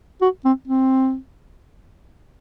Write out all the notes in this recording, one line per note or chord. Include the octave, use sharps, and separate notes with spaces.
F#4
C4
C4